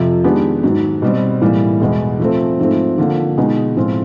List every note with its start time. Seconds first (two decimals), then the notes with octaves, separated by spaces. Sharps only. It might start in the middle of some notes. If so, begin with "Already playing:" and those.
Already playing: F2 C3 F3
0.24 D#3 G#3 B3 D4 G4
0.63 G#2 D#3 F#3
1.02 B2 G3 C4
1.41 A2 E3 G3 A#3
1.80 E2 B2 G#3
2.19 F3 A3 C4
2.59 G#2 F3 A3 C4
2.98 D3 F3 A#3
3.37 B2 G#3 B3 D#4
3.76 A2 F3 G#3 C4 F4